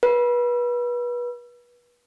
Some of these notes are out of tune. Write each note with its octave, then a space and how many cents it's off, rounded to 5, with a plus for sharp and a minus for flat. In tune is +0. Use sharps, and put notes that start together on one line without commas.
B4 -30